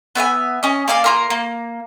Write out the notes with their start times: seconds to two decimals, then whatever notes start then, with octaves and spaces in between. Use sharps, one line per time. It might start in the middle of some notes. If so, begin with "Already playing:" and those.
0.15 B3 E5 F5 G#5
0.63 C#4 D#5
0.88 A#3 D5 F5 G#5
1.04 A#3 F4 A#4
1.30 A#3